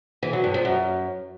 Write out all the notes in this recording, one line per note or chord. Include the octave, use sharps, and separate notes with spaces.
E3
F#3
G2
F3
F#2